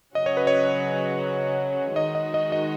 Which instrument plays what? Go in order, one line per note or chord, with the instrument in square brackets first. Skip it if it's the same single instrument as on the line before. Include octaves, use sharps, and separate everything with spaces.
[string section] C#3 F#3 C#4 F#4 [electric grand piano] D#5
[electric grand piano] C#5
B4
C#5
[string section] D#3 G#3 D#4 F#4 [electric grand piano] D#5
[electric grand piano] D#5
D#5
D#5